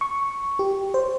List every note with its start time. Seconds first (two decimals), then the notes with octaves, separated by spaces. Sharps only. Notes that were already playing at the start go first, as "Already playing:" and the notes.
0.01 C#6
0.59 G4
0.94 C5